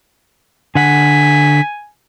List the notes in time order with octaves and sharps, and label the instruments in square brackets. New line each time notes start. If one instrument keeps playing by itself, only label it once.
[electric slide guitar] D3 F#5 [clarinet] G#5 [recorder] B6